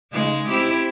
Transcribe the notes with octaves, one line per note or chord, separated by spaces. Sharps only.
C#3 G#3 D#4
C4 E4 G4